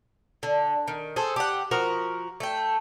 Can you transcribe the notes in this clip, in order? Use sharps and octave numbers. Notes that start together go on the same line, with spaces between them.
D3
D#3
G#4 A4 C5
G4 F#5
F3 F#4 A#4
A3 G5